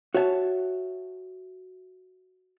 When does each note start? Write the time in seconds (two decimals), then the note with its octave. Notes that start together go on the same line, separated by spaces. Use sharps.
0.14 F#4 C#5 E5 G#5 A5